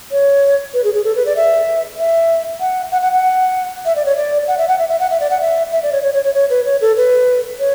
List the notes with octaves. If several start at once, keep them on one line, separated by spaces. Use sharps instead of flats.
C#5
B4
G#4
G#4
A4
B4
D5
E5
E5
F#5
F#5
F#5
F#5
E5
D5
C#5
D5
F#5
E5
F#5
E5
E5
F#5
E5
D5
F#5
E5
E5
D5
C#5
C#5
C#5
C#5
C#5
B4
C#5
A4
B4
C#5